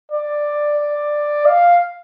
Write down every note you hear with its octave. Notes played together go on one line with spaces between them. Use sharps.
D5
F5